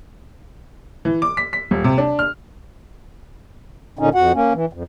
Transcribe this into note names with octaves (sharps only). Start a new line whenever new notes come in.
E3
D6
B6
B6
D#1
C3
D4
F6
A#2 D3 C#4 D#4
F2 F#4 F#5
A#3 C#4
E3
F2